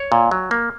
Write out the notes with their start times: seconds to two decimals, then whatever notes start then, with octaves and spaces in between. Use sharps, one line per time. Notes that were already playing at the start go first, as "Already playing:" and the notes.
Already playing: C#5
0.12 A#2
0.31 F#3
0.51 A#3